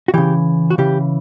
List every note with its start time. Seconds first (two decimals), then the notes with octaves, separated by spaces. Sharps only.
0.08 F#4
0.14 C#3 E3 G4
0.70 F#4
0.78 C#3 E3 G4